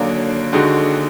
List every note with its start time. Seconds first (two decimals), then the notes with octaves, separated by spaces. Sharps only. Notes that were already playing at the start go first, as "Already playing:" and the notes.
Already playing: D#2 D3 F#3 A#3 D4
0.53 D#2 D3 G#3 D#4 F#4